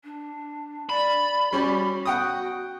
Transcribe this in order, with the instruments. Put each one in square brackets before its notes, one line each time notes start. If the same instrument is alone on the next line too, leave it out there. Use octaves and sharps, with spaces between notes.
[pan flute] D4
[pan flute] D5 [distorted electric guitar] B5
[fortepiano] G3 C#4 G4 [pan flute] F#4
[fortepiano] F#5 G5 D#6